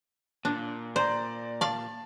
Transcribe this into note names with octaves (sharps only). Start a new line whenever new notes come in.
A#2 D4
C5 D5 A#5
D5 F5 A5